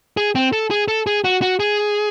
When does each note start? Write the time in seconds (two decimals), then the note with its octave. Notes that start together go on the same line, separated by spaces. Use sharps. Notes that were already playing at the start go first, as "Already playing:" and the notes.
0.17 G#4
0.35 C4
0.53 A4
0.71 G#4
0.88 A4
1.07 G#4
1.24 F#4
1.42 F#4
1.60 G#4